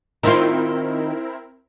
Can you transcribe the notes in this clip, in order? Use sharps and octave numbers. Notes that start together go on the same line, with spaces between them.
D#3 C4 E4 F4 A#4